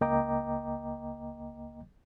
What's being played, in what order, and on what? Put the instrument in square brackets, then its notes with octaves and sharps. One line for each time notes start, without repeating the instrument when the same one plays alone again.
[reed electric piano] C#2 A#3 D#5 G5 A#5 D6